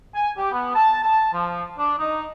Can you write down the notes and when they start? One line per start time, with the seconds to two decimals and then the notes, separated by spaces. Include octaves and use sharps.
0.14 G#5
0.36 G4
0.52 B3
0.74 A5
1.03 A5
1.32 F3
1.77 D4
1.98 D#4